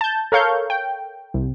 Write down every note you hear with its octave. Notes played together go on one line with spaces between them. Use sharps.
A5 G6
A4 A#4 C#5 F5 C#6 G6
G5
C2